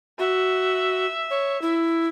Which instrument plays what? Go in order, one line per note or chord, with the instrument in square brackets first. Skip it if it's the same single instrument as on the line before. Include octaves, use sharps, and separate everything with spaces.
[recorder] F#4 [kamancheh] E5
[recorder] C#5
E4